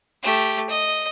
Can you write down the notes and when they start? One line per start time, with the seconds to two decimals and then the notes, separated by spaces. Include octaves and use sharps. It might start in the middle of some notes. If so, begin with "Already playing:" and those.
0.23 A3 G4
0.69 D#5